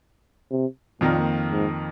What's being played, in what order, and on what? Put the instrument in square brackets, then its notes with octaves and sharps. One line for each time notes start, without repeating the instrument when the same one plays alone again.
[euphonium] C3
[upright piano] F2 D#3 A#3 F4 A#4 [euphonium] A#2
[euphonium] G#2